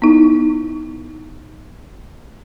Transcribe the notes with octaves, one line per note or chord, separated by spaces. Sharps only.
B3 D#4 E4